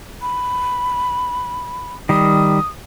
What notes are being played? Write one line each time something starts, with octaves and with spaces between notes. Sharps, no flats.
B5
D#3 G3 D#6